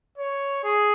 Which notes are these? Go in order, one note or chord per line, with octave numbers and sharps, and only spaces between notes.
C#5
G#4